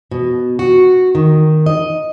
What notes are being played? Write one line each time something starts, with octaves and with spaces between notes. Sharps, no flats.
B2
F#4
D#3
D#5